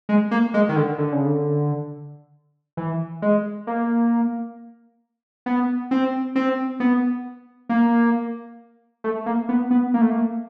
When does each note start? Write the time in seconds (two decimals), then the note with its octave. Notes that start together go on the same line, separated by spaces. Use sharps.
0.09 G#3
0.31 A#3
0.54 G#3
0.69 D#3
0.76 D3
0.98 D3
1.12 C#3
1.26 D3
2.77 E3
3.22 G#3
3.67 A#3
5.46 B3
5.91 C4
6.36 C4
6.80 B3
7.69 A#3
9.04 A3
9.26 A#3
9.49 B3
9.71 B3
9.94 A#3
10.02 A3
10.10 A#3